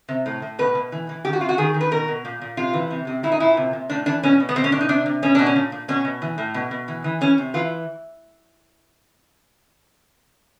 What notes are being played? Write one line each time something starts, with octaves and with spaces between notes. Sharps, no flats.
C3
A2
A2
B2 B4
B2
E3
E3
D#3 G4
F#4
C3 F4
F#4
D#3 G#4
D#3
B4
B2 A#4
B2
A#2
A#2
C3 F4
E3
C3
C3
A#2 E4
D#4
A#2 E4
C3
C3
A2 D4
E3 D4
B2 C#4
B2
B3
B2 C4
C#4
B2 D4
D#4
C3 D4
C3
B2 C#4
B2 D4
C#4
A#2
A#2
B2 C#4
B2
E3
A2
B2
B2
E3
E3
E3 C#4
C3
E3 F4